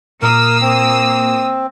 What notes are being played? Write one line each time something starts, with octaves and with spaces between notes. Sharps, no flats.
A#2 A#3 A#4 D#6 E6
C4